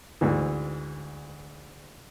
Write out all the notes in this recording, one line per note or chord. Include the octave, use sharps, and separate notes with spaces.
D2 G#2 E3